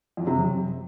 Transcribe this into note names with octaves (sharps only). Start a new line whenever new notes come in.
F2
C3
F#2